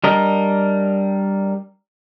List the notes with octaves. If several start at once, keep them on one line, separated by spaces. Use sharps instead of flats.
G3 D4 A#4 D#5